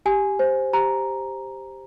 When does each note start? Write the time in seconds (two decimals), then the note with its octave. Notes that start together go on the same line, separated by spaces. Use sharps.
0.06 G4 G#5
0.39 C5
0.73 G4 A#5